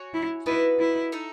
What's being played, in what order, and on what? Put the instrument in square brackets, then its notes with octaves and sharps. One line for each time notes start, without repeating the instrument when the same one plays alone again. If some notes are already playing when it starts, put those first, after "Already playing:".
Already playing: [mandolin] F#4 C#5 G#5
[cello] E4
[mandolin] B3 D#4 F#4 B4 [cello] E4
[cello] E4
[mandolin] D#4 A4 E5